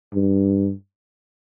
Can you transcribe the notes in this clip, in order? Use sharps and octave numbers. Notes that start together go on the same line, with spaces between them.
G2